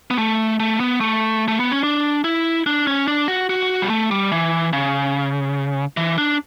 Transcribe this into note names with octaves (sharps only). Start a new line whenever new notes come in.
B3
A3
A3
B3
A3
A3
B3
C#4
D4
E4
D4
C#4
D4
F#4
F#4
G3
A3
G3
E3
C#3
E3
D4